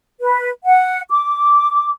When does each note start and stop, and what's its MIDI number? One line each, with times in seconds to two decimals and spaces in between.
0.20 0.49 71
0.65 1.01 78
1.11 1.91 86